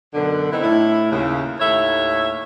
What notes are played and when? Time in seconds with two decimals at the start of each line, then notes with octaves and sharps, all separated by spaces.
0.14 F#2 B2 D3
0.51 B3 C4 D#4 E4
0.63 A2 E4
1.11 D#2 C#3
1.59 D#2 A2 A3 C#5 E5